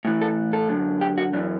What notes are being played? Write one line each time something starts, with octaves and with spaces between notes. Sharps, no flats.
A2 E3
A4
A4
F#2 D3
G4
F#4
F#2 E3 D4